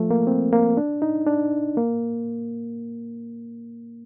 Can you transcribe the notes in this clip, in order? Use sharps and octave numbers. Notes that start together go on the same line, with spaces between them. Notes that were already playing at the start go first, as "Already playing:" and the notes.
Already playing: F3 A3
A#3
C4
A#3
D4
D#4
D4
A#3